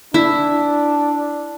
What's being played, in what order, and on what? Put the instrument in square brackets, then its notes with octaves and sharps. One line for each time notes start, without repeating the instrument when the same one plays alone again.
[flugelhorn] D4 [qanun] E4